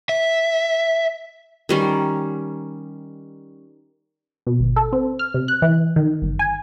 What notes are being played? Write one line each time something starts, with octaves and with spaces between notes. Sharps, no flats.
E5
D#3 G3 C#4
B2
G#1
A4
C4
F6
C3
F#6
E3
D#3
G1
G#5